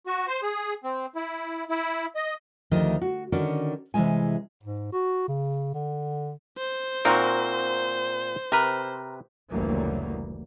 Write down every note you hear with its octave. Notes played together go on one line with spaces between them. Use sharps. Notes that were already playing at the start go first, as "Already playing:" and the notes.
F#4
C5
G#4
C4
E4
E4
D#5
D2 D#3 F3 A3 G4 D#5
F#4
D3 D#3 C#4 F#4 D5
C3 E3 F3 G3 G#3 G#5
G#2
F#4
C#3
D3
C5
A#2 C4 D#4 F#4 A#4
C3 A#4 B4
F#1 D2 E3 F#3 G3 A#3